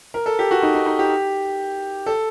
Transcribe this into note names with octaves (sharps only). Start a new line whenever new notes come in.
A#4
A4
G4
F#4
D#4
D#4
D#4
G4
A4